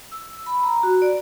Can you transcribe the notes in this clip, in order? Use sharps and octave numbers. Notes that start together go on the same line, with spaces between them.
E6
B5
A#5
F#4
D5